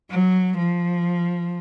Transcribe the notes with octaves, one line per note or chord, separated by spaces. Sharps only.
F#3
F3